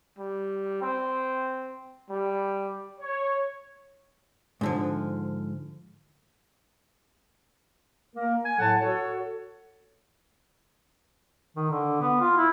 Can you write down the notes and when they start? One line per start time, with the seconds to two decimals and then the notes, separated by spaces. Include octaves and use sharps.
0.18 G3
0.82 C4
2.09 G3
3.00 C#5
4.61 G#2 D3 F3
8.16 A#3 A#4
8.45 G#5
8.59 A2 F#3 A4 C#5 F#5 A5
8.81 F#4 A4 C#5
11.56 D#3
11.70 D3
12.01 B3
12.20 F4
12.37 E4